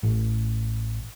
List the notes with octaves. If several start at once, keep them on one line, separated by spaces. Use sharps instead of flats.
A1